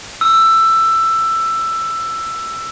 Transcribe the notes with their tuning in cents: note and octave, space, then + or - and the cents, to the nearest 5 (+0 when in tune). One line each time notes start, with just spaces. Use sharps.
E6 +15